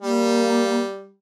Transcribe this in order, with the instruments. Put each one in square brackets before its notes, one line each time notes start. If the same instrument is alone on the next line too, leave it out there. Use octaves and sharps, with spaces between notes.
[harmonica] G3 [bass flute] A#3